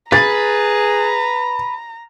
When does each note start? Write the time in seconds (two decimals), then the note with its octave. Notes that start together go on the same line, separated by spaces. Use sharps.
0.12 G#4 B4 A#5 A6